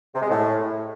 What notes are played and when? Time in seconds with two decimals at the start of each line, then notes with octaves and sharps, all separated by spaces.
0.14 C3
0.21 G#3
0.29 A2